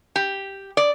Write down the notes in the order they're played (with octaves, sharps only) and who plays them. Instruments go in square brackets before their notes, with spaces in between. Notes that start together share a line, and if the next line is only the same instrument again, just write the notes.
[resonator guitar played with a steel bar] G4
D5